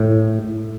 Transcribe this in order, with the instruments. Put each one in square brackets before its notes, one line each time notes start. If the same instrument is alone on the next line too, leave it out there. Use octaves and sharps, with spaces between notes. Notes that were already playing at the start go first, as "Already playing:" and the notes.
Already playing: [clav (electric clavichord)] A2